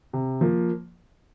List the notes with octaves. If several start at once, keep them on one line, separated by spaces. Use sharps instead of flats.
C3
F3 A#3